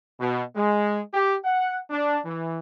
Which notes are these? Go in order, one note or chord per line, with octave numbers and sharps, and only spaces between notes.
B2
G#3
G4
F#5
D4
E3